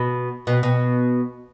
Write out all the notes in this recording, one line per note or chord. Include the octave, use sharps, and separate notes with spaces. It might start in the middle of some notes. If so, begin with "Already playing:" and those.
Already playing: B2
B2
B2